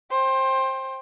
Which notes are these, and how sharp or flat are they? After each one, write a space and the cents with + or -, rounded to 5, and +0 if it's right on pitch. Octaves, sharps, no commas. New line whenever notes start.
C5 +20 G5 +10